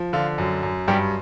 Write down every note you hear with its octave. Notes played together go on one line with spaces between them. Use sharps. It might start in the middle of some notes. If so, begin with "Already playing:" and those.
Already playing: F3
D3 F4
F#2
F#2
G2 G3 G4